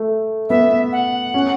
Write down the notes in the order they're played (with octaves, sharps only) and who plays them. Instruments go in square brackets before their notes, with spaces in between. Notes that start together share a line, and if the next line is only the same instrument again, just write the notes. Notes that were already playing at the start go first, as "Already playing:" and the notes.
Already playing: [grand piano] A3
[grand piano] B3 [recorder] E5
[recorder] F#5
[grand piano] C#4